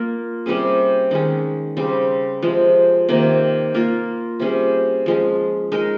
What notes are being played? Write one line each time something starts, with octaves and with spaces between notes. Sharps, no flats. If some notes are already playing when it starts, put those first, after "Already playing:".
Already playing: A#3 F4 A#4
C3 G3 C#4 G#4
D#3 G#3 C#4
C#3 G3 C4
C3 F3 G#3
C3 D#3 A#3
A#3 F4 A#4
C3 G3 C#4 G#4
F3 G#3 C#4
G#3 D#4 A#4